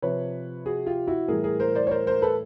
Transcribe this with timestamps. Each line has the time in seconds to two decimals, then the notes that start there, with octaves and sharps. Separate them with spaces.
0.02 C3 F3 B4 C#5
0.66 F#4 G#4
0.86 F4 G4
1.07 E4 F#4
1.28 A2 E3 G3 G#4 A#4
1.44 G#4 A#4
1.60 A#4 C5
1.75 C5 D5
1.87 C#5
1.91 A#4 C5
2.07 A#4 C5
2.22 A4 B4